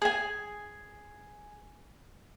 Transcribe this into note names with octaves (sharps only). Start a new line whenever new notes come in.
G#4 G#5